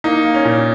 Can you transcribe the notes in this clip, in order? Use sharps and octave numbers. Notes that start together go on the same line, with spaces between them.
A#3 D#4
A#3
C#4
A#2